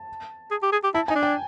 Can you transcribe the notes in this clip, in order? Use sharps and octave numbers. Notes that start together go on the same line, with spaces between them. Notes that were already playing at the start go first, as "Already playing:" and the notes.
Already playing: A5
G#4
G4
G#4
G4
E4 A5
D#4 G#5
D4
G5